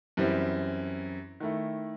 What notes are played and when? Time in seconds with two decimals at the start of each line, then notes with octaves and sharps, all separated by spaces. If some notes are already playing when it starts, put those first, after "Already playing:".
0.17 F#2 E3 G3 C4
1.40 D#3 A3 E4